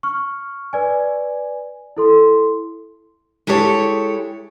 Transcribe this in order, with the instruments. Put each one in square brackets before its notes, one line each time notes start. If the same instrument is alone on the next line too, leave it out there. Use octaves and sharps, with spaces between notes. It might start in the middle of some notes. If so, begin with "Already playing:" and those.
[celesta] C#6 F6
B4 D5 G#5
E4 A4 C6
[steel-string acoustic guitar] G#3 E4 G4 A4 C#5